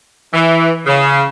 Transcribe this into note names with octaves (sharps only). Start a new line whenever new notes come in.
E3
C#3